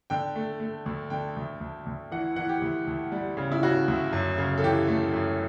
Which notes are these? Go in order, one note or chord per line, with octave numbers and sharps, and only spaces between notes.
D3 G5
A3
A3
D2
D3 G5
D2
D2
D2
E3 F#5
E3 F#5
G4
D2
D2
G3
C#3
E4
C#3 F#4
D2
F#2
C#3
A4
E3 G4
A3
F#2